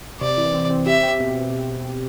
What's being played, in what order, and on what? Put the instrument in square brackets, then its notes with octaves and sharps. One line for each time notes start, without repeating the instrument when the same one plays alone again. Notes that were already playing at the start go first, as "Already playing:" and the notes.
[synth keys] C3 [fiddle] D5
[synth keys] E3
C4
C4
[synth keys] G4 [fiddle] E5
[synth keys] G4
B2